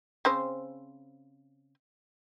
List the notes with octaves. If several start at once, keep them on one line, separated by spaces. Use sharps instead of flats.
C#3 C4 C5